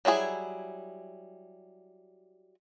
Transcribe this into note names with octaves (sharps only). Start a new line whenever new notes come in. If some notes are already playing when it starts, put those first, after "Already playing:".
F#3 G3 E4 G#4